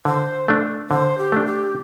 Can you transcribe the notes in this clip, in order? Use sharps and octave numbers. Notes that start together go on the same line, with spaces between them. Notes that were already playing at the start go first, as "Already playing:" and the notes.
D3 C5
A3 D4
D3 C5
G4
A3 D4
G4